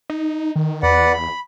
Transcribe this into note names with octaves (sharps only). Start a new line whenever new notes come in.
D#4
D#3
E2 B4 D5 F#5
B5